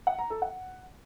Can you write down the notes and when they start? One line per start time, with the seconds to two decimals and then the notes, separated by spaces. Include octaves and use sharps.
0.07 F#5
0.19 A#5
0.30 A4
0.42 F#5